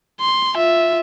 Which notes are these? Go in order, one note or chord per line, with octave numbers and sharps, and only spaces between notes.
C6
F4 E5